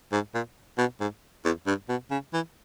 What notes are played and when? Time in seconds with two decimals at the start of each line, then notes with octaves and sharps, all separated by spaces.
0.12 G#2
0.34 A#2
0.78 B2
1.00 G#2
1.45 E2
1.67 G2
1.89 B2
2.11 C#3
2.33 E3